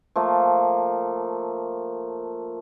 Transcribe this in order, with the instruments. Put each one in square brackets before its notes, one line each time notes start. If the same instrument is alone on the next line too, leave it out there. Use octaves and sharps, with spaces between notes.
[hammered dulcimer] F3 A3 A#3